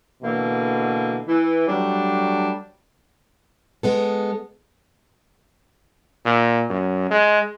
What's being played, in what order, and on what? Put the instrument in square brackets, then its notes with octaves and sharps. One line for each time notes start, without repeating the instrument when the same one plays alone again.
[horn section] B2 D3 E3 A#3
E3
F#3 G3 A3 D4
[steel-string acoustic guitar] G#3 B3 A4
[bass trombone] A#2
F#2
G#3